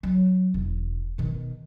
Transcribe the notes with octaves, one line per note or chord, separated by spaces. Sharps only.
F#3
E1
B2 D#3